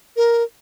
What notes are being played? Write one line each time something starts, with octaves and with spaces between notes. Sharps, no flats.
A#4